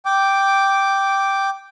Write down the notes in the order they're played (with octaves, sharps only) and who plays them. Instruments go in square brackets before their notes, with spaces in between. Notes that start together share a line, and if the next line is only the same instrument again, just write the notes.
[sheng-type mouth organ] G5 D6